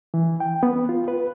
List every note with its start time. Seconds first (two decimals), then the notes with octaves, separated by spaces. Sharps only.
0.14 E3
0.40 G5
0.63 B3
0.89 F4
1.08 B4